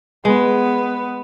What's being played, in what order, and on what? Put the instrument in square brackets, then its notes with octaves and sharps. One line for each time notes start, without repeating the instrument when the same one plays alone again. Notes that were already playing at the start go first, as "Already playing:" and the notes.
[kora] G#3 [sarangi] B3